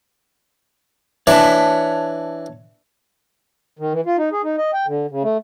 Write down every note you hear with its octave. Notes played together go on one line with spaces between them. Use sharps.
E3 D4 C#5 A5
D#3
E3
F4
D#4
G#4
D#4
D#5
G5
D3
C#3
A3